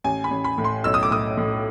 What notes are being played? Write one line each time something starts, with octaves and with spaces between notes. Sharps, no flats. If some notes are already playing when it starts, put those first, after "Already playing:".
A1 G#5
B5
A1
B5
A2
C6
B1 E6
D#6
D6
A2 D#6
A2